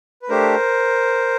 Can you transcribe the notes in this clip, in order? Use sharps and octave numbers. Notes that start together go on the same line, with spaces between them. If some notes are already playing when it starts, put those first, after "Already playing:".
B4
A3 D4 G4 A#4 C5